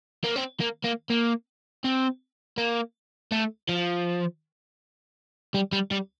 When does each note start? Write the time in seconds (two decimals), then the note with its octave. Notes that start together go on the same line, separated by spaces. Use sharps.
0.24 A#3
0.36 C4
0.61 A#3
0.84 A#3
1.10 A#3
1.84 C4
2.58 A#3
3.32 A3
3.69 F3
5.54 G3
5.72 G3
5.91 G3